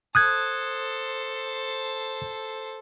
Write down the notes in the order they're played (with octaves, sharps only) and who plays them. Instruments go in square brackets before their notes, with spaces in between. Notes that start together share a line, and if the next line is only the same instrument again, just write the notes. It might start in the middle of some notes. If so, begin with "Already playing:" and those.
[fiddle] A4 C5 [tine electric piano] D#6 F#6 G#6